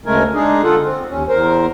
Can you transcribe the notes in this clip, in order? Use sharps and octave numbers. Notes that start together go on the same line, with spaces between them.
D2 C#3 G#3 A3 A#4 G#5
G#3 D4 D#4 G#4
D3 F4 A4 F#5
C4
D#2 C#4
E2 A#4 C5